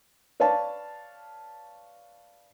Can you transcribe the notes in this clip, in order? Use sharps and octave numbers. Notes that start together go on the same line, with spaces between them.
B4 C#5 D5 F5 A5